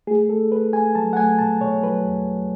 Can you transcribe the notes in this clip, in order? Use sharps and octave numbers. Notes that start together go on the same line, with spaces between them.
A3 G#4
A3 A4
A3 B4
A3 G#5
F#3 A5
F#5
A3 G#5
B2 A5
B2 C#5
F#3 B4
E2
F#3